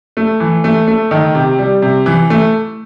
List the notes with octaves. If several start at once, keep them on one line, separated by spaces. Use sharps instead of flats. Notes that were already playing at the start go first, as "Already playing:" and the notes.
A3
E3
A3
A3
D#3
C3
G3
C3
E3
A3